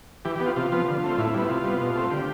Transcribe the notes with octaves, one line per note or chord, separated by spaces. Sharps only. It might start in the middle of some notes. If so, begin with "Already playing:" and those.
E3 G4
B3 G4
F4
C3 F4
F3 B3
D3
A3 C4
A2 E4
G3 B3
C3 F4
G3 B3
B2
A3 C4
D3 G4